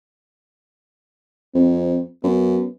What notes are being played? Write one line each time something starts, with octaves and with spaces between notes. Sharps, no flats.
F2 C4
F#2 B3